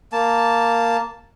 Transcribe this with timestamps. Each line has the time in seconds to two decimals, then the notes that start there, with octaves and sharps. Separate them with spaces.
0.12 A#3 A5